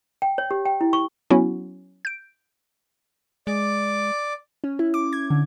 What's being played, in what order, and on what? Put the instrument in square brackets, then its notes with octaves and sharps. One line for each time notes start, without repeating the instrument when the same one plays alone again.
[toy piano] G5
C#5
G4
G5
E4
C#6
[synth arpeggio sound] F#3 B3 C#4 E4 F#4
G6 D7
[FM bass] G#3 [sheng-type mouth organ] D5 D6
[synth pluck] C#4
E4
D6
G#6
D3